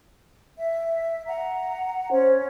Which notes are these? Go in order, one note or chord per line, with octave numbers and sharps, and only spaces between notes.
E5
F#5 A#5
C#4 C5